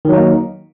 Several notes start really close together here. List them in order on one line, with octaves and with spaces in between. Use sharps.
D#3 F#3 D#4 A#3